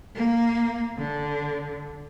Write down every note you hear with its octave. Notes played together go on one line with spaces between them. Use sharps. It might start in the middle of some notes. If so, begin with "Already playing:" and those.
A#3
D3